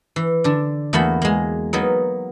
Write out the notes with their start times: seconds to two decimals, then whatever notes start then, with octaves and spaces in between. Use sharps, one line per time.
0.16 E3
0.44 D3 D4
0.93 E2 A3 A#3 F#4 F#5 B5
1.22 G#3 A#3
1.73 F#3 A#3 B3 D#4